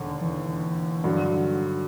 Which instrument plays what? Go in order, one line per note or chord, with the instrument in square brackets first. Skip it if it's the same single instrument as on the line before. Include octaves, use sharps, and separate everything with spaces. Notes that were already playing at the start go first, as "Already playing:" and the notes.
Already playing: [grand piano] E1 D#2 D3
[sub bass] E3
[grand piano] G2 D3 F#3